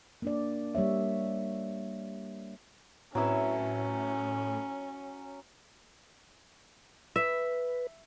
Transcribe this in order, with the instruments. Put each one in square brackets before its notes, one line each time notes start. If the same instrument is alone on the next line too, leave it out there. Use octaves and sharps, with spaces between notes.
[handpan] A#3 D4 D5
G3 A#3 C#5 E5
[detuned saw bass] A2 [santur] F#3 E6 [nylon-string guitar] C4 E4 B4 [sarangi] C#4
[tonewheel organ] B4 [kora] E5